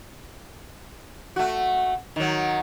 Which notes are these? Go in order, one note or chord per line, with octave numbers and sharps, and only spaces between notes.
A3 F#4
D#3 F#3